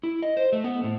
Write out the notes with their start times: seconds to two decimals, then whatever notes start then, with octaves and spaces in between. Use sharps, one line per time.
0.03 E4
0.23 D#5
0.37 C5
0.52 A3
0.64 B3
0.84 A2